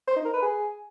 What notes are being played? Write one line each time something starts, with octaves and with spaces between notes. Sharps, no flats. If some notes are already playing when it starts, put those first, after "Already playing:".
C5
D#4
A#4
B4
G#4